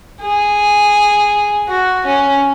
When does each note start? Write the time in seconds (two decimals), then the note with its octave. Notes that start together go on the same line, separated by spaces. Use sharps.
0.21 G#4
1.69 F#4
2.06 C#4